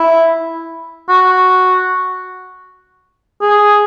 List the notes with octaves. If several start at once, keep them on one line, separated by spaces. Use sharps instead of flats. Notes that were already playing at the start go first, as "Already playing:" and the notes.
Already playing: E4
F#4
G#4